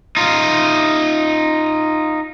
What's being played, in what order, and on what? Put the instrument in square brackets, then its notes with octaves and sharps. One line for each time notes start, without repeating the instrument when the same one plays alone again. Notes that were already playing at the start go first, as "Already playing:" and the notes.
[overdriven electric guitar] D#4 F4